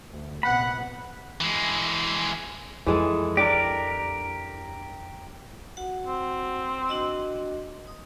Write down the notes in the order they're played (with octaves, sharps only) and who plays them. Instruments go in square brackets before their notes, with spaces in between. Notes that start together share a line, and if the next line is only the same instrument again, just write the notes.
[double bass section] D2
[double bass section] A#1 C3 B3 [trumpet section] F#5 [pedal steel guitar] B5
[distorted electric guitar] E3 G#3
[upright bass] F2 [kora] E3 G#3 A4
[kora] D4 D5 [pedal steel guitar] G4 A#4
[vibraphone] F#4 F#5
[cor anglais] C4
[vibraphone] D4 F#4 D#5
D#6